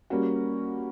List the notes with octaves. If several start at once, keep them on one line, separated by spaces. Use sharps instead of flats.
G3 A#3 C#4 F#4